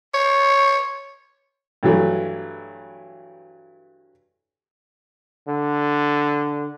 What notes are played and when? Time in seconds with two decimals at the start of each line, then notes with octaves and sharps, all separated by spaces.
0.14 C#5
1.83 G2 E3 F#3 A3
5.48 D3